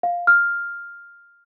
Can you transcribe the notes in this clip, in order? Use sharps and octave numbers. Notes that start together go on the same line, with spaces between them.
F5
F6